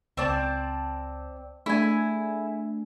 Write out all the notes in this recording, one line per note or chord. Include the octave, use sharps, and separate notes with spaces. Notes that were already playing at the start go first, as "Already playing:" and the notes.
C#2 C4 D5 A5
A3 D4 E4 G#4 G#5